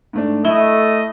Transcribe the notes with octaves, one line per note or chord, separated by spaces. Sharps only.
G#2 A3 D4
A3 E4 D#5 G7